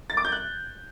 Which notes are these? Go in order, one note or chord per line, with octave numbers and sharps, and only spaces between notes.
A6
D6
G6
F#6